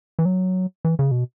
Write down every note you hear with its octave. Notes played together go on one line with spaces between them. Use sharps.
E3
F#3
E3
C#3
B2